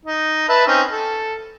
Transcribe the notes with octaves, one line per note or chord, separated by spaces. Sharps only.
D#4
B4 E5 A5
C4 C#4 D#4
A4